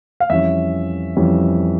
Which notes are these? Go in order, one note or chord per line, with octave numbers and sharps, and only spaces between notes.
F5
F2 E3 G3 C#4 E5
F2 E3 G3 C#4